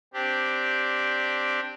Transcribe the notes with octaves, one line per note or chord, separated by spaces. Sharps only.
C4 D4 G4